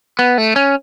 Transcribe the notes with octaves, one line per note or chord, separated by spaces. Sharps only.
B3
A3
C#4